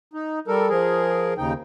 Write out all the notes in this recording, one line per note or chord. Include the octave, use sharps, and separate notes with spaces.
D#4
G3 A4 A#4
F3 G#4 A#4
D#2 C#3 D#4 G5